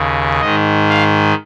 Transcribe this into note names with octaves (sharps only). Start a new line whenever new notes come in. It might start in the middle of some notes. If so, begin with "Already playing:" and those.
Already playing: D#2 C#3
G#2 D#3 D#5
F5